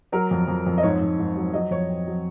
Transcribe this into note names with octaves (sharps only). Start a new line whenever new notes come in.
F#3 A#4
F2
F2
F2
D#5
G#2 C#5
G#2
G#2
F#3
F#3 D#5
F2 C#5
C4
F#3